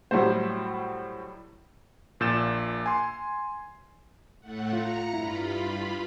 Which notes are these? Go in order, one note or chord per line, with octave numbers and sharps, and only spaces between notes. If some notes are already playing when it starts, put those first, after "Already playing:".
A2 F#3 G3 A3 C5
A#1 A#2 E6 G6 A6 E7
G#5 C6
A2 A3 F#5
F4 A#5 A#6 C#7
G2 E4 F4 B5